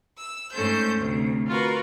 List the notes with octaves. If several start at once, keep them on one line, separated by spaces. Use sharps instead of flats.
E6
G#2 A3 C#4 A4 C5 G6
D2 C3
F4 F#4 A#4 B4